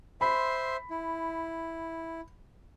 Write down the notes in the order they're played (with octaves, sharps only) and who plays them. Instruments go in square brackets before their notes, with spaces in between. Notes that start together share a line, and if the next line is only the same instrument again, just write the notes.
[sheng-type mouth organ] C5 E5 C6 [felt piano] B5
[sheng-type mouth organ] E4